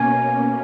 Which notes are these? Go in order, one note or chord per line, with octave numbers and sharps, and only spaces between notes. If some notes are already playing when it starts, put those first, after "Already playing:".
Already playing: B2 A#3 C#4 G#5